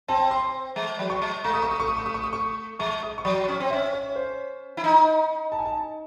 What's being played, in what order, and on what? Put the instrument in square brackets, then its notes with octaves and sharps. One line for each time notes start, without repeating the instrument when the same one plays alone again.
[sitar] C4 [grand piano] A5
[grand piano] C6
[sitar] G#3
F#3
[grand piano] C#6
[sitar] G#3
[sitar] A3 [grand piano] C#6
[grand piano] D#6
C#6
D#6
C#6
D#6
C#6
D#6
C#6
D#6
C#6
[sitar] G#3 [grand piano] C#6
[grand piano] D#6
C#6
[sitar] F#3 [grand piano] D#6
[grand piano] C#6
[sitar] C#4 [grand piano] D#6
[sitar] C4
[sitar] C#4 [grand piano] E5
[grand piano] C#5
C5
[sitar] E4
D#4
[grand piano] A5
G#5
A5